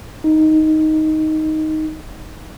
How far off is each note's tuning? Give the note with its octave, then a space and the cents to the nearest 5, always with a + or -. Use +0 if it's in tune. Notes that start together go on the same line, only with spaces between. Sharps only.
D#4 +5